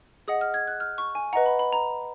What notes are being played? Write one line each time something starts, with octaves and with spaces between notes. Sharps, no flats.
G#4 D#5 F#5 D#6
F6
G#6
F#6
F6
C#6
G#5
B4 D#5 F#5 A#5
B5
B5
A#5